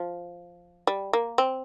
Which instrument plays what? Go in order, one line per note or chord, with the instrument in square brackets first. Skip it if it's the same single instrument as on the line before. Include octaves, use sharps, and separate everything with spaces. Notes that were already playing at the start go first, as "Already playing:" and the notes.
Already playing: [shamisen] F3
G3
A#3
C4